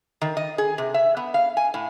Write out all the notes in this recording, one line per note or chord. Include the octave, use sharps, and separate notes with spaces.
D#3
D#5
G#4
C3
E5
B3
F5
G#5
A2